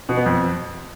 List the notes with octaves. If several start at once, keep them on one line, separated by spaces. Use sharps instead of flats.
B2
B3
F2